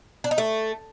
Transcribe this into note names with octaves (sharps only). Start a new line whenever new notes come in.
D4
D#4
A3